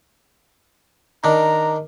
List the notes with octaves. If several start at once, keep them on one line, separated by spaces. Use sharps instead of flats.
D#3 D4 A#5